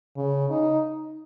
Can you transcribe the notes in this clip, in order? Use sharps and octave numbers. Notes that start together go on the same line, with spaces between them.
C#3
D#4